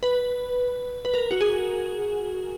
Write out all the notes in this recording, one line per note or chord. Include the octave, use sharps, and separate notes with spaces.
B4
B4
A#4
F#4
G#4